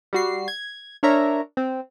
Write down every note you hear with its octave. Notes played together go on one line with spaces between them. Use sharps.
G3 F#4 C7
G#6
D4 A#4 C#5 E5 A#5
C4